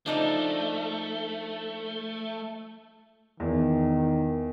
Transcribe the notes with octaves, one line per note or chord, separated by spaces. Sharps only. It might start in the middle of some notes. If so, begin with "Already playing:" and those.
F3 A3 D4 D#4
E2 D#3